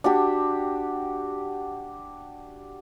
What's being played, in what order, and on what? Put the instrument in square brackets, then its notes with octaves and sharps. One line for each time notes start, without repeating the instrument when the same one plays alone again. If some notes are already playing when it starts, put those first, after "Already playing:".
[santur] D4 F#4 G4